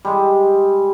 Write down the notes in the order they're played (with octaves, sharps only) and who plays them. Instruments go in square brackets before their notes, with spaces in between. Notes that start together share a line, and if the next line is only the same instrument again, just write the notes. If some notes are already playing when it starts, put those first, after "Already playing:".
[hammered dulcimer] G3 G#3